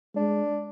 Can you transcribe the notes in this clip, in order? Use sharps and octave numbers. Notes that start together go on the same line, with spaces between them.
G#3 D4